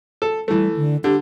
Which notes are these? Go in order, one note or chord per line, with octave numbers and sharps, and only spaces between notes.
A4
E3 G3 A3
D3
D3 G4